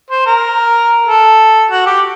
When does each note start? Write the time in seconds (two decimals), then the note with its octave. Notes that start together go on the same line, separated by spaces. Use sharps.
0.10 C5
0.26 A#4
1.07 A4
1.71 F#4
1.86 G4